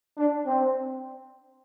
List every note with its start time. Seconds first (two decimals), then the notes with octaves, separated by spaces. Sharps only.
0.17 D4
0.45 C4